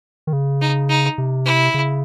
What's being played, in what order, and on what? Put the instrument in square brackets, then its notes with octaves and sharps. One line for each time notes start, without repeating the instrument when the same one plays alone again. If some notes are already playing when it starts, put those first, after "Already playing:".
[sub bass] D#3
C#3
[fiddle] D#4
D#4
[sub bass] C3
[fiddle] E4
[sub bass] C#3